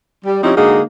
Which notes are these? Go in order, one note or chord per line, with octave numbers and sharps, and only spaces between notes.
G3
F3 C4 C#4 D#4 E4 G4
D3 G#3 A#3 D#4 F#4 G#4